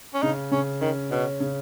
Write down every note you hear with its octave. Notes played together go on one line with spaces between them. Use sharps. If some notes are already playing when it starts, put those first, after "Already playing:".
C#4
C#3 D#4
C#3 C#4
D#3 C#4
B2 C#4
C#3